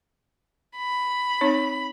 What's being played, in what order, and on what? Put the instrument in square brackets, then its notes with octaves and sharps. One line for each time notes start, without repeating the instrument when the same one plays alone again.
[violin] B5
[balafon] C4 D#4 C#5